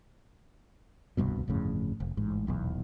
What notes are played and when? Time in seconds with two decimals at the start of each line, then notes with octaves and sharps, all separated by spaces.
1.17 D1 C2 G2 B2
1.48 G1 F2 A2 C#3
2.00 F1
2.17 A1 G#2
2.47 D#1 B1 E2